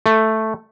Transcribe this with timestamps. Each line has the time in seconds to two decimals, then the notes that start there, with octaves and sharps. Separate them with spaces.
0.06 A3